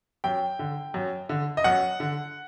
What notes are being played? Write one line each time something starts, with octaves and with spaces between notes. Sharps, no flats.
F#2 G5
D3
F#2
D3
D#5
F#2 F#5
D3